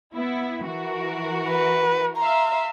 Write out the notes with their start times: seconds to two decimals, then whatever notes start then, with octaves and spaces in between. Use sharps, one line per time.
0.14 B3 E4
0.67 E3 F#4 A#4
1.49 B4
2.17 E5 F5 A#5 C6